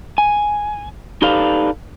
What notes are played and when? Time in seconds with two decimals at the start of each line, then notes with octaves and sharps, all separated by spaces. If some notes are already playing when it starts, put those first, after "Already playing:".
0.18 G#5
1.22 D#4 G4 A4 B4 D5 F5